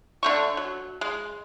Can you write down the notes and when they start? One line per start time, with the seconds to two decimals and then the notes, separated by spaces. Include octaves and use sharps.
0.23 D3 A3 C#6
0.57 F#3
1.01 G#3